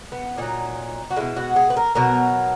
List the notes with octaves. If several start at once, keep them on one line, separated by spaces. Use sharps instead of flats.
B3
A#2 F#3 D#4
F#4
B2 G#3 E4
F#4
G#4
B4
A#4
B2 F#3 A#4